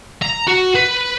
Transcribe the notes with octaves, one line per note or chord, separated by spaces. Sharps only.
A#5
F#4
B4